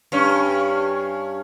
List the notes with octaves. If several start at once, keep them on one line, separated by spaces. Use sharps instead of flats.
G2 C#4